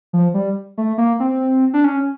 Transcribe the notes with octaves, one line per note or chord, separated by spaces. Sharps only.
F3
G3
A3
A#3
C4
D4
C#4